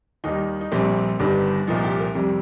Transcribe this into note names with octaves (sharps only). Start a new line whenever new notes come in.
D#2 D#3 G3 D#4
D#4
A#1 A#2 G3 C4
G1 G2 D#3 G3
C2 A#2 F3 D#4
G4
A#4
F2 C3 G3